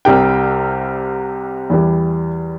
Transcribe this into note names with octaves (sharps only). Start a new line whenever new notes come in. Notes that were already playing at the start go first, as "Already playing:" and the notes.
C2 C3 G3 G5
E2 E3 G3